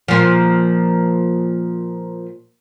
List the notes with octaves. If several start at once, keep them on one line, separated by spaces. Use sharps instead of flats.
A#2 F3